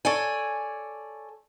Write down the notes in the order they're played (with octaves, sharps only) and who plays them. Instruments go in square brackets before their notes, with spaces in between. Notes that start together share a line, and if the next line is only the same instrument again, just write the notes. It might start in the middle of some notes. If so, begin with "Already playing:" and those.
[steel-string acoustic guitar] A4 C#5 D5 G#5